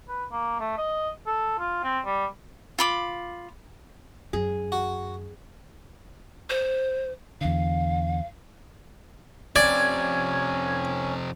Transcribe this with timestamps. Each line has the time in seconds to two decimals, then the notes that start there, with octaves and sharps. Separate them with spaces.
0.08 B4
0.32 A#3
0.60 A3
0.78 D#5
1.26 A4
1.59 F4
1.84 C4
2.05 G3
2.79 F4 B5 D6
4.33 F#2 G#4
4.72 F#4
6.50 C5
7.41 E2 D3 F5
9.56 F2 C3 C#4 D5 G#6